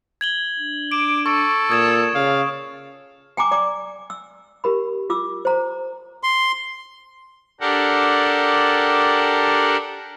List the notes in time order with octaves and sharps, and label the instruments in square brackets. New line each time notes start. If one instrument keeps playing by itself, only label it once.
[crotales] G#6 F#7 G7
[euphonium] D4
[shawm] D6 [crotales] D7 E7
[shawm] A4 [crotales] C#6
[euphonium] A#2 [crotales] D#6 G#6 E7
[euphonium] C#3 [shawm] F5
[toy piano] G5 G#5 A#5 D6
D5 G5 A#5 D6
E6
G4 A#4 B5
F4 D6 E6
C5 A#5
[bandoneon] C6
[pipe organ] D4 G4 A4 A#4 F#5